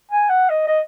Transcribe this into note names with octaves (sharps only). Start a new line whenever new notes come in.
G#5
F#5
D#5
D#5